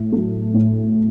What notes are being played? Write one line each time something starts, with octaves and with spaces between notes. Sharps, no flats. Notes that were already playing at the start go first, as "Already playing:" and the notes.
Already playing: A2
F#3 A3
A2